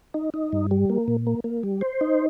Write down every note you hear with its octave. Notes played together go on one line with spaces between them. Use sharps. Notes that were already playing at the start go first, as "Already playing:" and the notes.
D#4
D#4
G2
G3
A#3
A#2
A#3
A#3
G3
C5
D#4